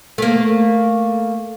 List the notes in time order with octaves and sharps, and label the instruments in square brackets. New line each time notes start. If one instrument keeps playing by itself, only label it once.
[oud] A3 A#3